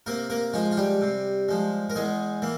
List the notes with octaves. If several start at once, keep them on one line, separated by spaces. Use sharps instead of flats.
C3 A#3 A#4
A#3 A#4
F3 G#3 F4
F4
G3 G4
C3
F3 G#3
A#4
E2 G#3 G#4
E3 A#3